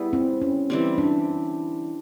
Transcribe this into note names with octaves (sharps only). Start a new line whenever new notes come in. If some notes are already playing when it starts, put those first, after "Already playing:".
Already playing: G3 B3 E4 G#4
C4
C#4
E3 G3 C4
D4